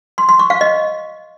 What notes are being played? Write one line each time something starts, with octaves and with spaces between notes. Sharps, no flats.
C6
C6
C#6
F5
D#5